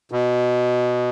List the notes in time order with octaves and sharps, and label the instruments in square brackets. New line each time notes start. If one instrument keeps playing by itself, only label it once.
[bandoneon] B2